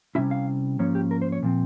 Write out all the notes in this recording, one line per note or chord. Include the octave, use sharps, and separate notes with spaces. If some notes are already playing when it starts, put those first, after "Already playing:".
C3 G3 C#4 E4 E5
F5
G#2 F3 A#3 C#4 C#5
G4
A#4
C5
C#5
A#2 F3 C4